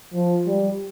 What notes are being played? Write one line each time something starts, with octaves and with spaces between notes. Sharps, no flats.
F3
G3